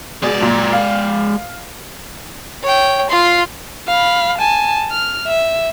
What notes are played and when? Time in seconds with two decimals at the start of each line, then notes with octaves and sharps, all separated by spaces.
0.22 B2 G#3 G#4 D5
0.41 F#2 A#2
0.73 F5
2.63 C#5 G5
3.10 F4 C6
3.88 F5 B5
4.38 G#5 A5
4.91 F6
5.27 E5